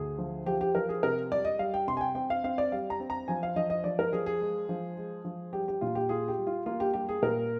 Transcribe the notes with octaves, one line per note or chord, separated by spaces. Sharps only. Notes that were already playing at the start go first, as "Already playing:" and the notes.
Already playing: D2 G#4
F3
F3 G4
G4
F3 A#4
G#4
C3 A#4
G3 D5
D#5
G3 F5
G5
C3 C6
G#5
G5
C4 G5
F5
C4 F5
D5
G3 F5
A#5
C4
A#5
F3 G#5
F5
F3 D#5
D#5
F3 D5
A#4
F3 G#4
G#4
G#3
F3
G#3
F3
G3 G4
G4
A#2 F4
G4
F4 G#4
G4
G3
F4
A#3 F4
G4
G3 G4
G#4
A#2 A#4